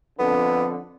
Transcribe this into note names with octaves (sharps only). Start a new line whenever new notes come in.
F2 D3 B3